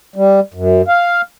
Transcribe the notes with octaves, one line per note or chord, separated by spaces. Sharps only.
G3
F#2
F5